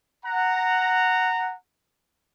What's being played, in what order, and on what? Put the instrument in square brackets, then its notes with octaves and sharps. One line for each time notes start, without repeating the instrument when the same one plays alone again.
[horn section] F#5 A#5